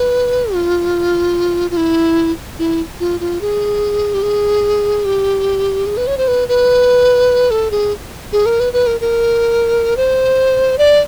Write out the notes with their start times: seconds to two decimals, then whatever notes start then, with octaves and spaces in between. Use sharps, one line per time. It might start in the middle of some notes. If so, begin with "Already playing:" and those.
Already playing: B4
0.54 F4
1.71 F4
1.77 E4
2.59 E4
3.00 F4
3.20 F4
3.41 G#4
4.14 G4
4.23 G#4
5.05 G4
5.86 G#4
5.97 B4
6.07 C#5
6.18 C5
6.28 B4
6.48 B4
7.51 A4
7.71 G#4
8.32 G#4
8.46 A#4
8.60 B4
8.73 B4
8.87 A#4
9.01 A#4
9.97 C5
10.78 D5